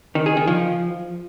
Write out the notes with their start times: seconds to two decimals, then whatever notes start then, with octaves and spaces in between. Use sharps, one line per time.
0.15 D#3
0.26 G#4
0.37 D#3
0.47 F3